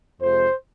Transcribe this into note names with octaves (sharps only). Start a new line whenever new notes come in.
F2 C3 F3 G#3 C5